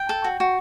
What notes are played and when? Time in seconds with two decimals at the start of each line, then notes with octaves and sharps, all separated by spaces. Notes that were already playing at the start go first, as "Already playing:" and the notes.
Already playing: G5
0.09 A4
0.24 F#4
0.40 F#4